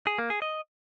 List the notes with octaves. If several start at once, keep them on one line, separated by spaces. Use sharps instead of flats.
G#4
A#3
G#4
D#5